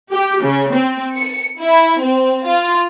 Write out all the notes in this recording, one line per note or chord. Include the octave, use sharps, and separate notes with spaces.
G4
C#3
C4
C#7
E4
C4
F4